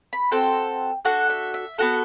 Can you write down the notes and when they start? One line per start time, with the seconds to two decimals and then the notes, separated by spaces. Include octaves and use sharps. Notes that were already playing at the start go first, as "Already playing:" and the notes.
0.13 B5
0.31 C4 F#4 A4 G5
1.05 D4 F#4 A4 F#5
1.30 E5
1.54 E5
1.78 B3 F#4 A4 F#5